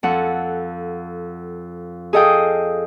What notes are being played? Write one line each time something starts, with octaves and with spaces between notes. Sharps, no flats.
F2 A4 F#5
G#4 A4 D#5 F5 G5 D#6